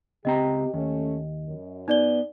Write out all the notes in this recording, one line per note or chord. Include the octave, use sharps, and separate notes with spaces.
C#2 C4 G4 D#5 A#5
D#2 A3 C#4
F#2
B3 D#4 D5 G7